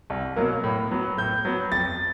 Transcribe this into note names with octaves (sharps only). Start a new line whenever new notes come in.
C2
B2 F#3 A#3
A2
F#3 B3
A2 G6
F#3 B3
F2 A6